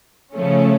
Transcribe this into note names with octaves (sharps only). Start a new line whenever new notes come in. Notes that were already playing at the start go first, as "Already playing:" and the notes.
C#3 F3 A3 C#4